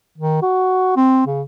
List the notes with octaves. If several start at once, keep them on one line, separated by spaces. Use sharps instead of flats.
D#3
F#4
C4
C#3